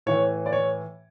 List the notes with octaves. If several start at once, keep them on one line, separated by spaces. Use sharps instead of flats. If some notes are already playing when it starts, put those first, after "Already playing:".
A2 E3 C#5
D5
C#5